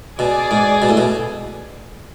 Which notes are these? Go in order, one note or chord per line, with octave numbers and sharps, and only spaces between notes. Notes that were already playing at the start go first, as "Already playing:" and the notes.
B2 G#4 D5 G#5
G#2
B2
A2
B2